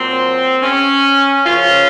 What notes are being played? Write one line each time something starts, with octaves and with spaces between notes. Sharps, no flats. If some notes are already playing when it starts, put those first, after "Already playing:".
Already playing: A#2 F#3 A#3 C4
C#4
F#2 C#3 F3 C#4 F4